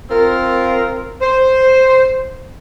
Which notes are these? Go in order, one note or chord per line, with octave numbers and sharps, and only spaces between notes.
C4 F4 A#4
C5